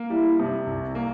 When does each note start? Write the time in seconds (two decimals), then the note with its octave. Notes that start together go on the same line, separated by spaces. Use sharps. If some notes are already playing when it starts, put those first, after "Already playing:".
Already playing: A#3
0.10 G3 E4
0.40 C3
0.67 C2
0.95 A#3